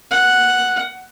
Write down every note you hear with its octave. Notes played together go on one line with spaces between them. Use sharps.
F#5